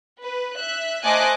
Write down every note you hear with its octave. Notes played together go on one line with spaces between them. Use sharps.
B4
E5 F#6
A3 C5 D#5 G#5 D6 F#6